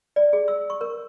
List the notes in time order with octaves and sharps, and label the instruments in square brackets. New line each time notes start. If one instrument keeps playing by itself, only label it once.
[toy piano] D5
G#4
E6
C#6
A#4